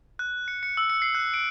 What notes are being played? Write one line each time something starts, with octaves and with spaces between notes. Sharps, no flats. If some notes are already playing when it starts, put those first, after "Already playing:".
F#6
C#7
C#7
E6
C#7
C7
F#6
D7